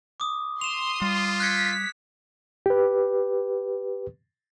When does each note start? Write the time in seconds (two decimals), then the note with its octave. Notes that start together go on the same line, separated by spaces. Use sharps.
0.20 D6 D#6
0.61 C6 D#6 E7 F7
1.02 G3 F4
1.40 F#6 G#6 B6 C#7
2.66 G4 B4